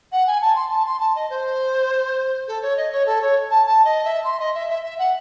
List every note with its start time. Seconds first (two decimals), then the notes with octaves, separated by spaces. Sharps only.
0.12 F#5
0.27 G#5
0.42 A5
0.56 C6
0.70 A5
0.86 C6
1.00 A5
1.16 D#5
1.30 C5
2.48 A4
2.62 C#5
2.77 D#5
2.92 C#5
3.06 A4
3.22 C#5
3.51 A5
3.66 A5
3.85 D#5
4.05 E5
4.24 C6
4.40 D#5
4.54 E5
4.69 E5
4.84 E5
4.99 F#5